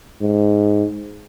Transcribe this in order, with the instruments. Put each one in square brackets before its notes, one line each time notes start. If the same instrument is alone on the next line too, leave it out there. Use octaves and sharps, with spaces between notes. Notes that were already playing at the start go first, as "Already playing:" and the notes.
[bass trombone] G#2